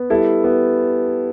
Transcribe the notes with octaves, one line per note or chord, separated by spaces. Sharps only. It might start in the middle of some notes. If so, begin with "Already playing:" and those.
Already playing: B3
G3 E4 A4
B3